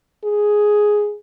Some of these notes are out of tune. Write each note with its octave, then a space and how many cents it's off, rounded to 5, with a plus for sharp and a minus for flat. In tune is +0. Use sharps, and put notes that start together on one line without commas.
G#4 +5